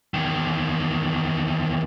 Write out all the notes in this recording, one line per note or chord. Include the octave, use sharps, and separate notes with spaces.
E2 D#3